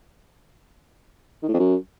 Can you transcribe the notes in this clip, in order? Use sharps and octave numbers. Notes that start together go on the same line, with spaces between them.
D#3
A2
F2
F#2